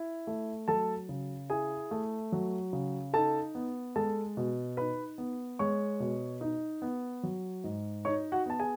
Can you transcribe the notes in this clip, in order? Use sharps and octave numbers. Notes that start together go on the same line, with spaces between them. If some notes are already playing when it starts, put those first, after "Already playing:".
Already playing: E4
A3
F#3 A4 A5
C#3
E4 G#4 G#5
A3
F#3
C#3
D#4 A4 A5
B3
G#3 A4 A5
B2
D#4 B4 B5
B3
G#3 C#5 C#6
B2
D#4
B3
F#3
G#2
D#4 C#5 C#6
F#4 F#5
B3 A5
G#4 G#5